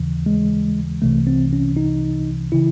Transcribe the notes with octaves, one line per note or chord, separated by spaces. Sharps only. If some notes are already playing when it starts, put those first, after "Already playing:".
Already playing: D#2 C#3 E3
G#3
C2 C3 E3 A3
C4
C#4
D#4
C#3 E3 E4